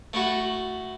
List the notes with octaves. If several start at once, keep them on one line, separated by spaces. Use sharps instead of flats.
A3 E4 F#4